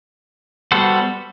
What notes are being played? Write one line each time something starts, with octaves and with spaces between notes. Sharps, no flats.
G3 B3 F#4 A4 C5